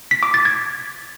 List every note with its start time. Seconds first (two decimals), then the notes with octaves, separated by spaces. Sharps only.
0.11 B6
0.23 D6
0.34 A6
0.45 G#6